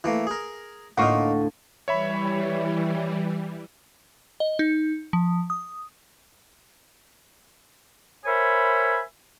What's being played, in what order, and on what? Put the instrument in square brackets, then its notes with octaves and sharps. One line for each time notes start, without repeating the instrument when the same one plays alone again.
[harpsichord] E3 A3 A#3
G#4 A#4
[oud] D2 A2 F4 [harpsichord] A#3 D#4 [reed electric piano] F#5 C#6
[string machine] E3 G3 [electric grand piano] C#5 E5 B5
[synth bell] D#5
D#4
F3
D#6
[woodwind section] A#4 C5 C#5 E5 G#5 B5